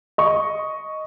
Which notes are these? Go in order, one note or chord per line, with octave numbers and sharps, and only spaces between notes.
D#5 C#6